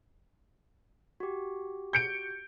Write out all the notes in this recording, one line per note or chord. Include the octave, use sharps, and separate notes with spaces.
F#4 G4
G6 C#7 D7